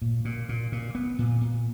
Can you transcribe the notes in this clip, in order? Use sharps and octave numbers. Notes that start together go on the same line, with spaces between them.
A#2
A#2
A#2
A#2
B3
A#2
A#2